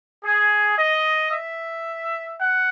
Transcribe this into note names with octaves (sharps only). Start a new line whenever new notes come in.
G#4
D#5
E5
F#5